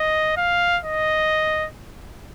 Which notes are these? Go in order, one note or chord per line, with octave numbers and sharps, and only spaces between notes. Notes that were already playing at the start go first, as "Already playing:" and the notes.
Already playing: D#5
F5
D#5